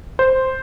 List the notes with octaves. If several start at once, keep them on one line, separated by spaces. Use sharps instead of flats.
C5